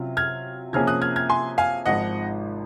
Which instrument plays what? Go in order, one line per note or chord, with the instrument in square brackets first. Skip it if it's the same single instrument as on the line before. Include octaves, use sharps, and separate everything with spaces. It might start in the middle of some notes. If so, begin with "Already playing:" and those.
Already playing: [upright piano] C3 F#3 C#4 F4
[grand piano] F6 G#6
[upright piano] C3 F3 A#3 C#4 G#4 [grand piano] F6 G#6
[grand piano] D#6 F#6
F6 G#6
F6 G#6
G#5 C6
F5 G#5
[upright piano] G#1 G#2 F3 [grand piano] D#5 F#5